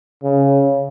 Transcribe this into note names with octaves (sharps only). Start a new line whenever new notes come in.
C#3